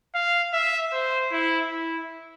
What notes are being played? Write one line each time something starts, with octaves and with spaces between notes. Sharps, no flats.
F5
E5
C5
E4
E4